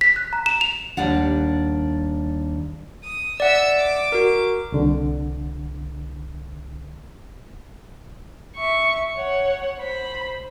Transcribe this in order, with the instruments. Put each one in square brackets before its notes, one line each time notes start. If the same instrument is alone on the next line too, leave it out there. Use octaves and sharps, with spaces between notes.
[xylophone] B6
F#6
A#5
E7
F7
[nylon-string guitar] D#2 G3 D4 F#5
[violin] D#6
[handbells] D5 F#5 [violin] E5 E6
[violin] D6
[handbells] F#4 A#4
[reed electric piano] C2 D3
[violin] E5 C#6
C#5 F#5
C5 B5